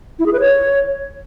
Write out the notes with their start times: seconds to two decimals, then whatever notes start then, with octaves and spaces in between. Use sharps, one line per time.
0.19 E4
0.26 G#4
0.33 B4
0.40 C#5